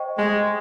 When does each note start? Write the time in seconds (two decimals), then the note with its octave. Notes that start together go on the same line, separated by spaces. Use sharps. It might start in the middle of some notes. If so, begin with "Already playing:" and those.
Already playing: C5 D#5 G5 C#6
0.17 G#3